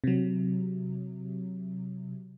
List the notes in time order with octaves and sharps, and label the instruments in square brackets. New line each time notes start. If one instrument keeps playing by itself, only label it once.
[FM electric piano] C3 F#3